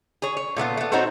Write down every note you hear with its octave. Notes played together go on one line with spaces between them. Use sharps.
G#4 C#5
C#5
A#2 A3 B3 F4
A3 B3
C4 D#4 F#4 A4 C5 C#5